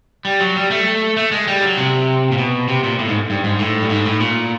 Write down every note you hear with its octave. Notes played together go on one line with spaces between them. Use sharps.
G3
F#3
G3
A3
A3
G#3
G3
F#3
C3
A#2
B2
C3
A#2
A2
G#2
G2
G#2
A2
G2
G#2
A2
A#2